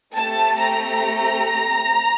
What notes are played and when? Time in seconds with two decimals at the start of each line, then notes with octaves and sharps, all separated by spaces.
0.14 A3 C4 G4 A5
0.59 A#5